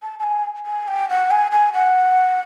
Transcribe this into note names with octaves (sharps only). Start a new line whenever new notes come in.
A5
A5
G#5
G#5
G5
F#5
G#5
G#5
F#5